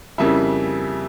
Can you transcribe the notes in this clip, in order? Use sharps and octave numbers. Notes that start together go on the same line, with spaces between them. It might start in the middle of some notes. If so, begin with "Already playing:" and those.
F2 C#3 G3 A#3 E4